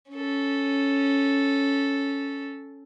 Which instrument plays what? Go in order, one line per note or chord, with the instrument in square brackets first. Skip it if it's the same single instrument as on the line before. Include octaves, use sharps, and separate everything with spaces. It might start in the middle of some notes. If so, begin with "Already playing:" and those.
[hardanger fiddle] C#4 A4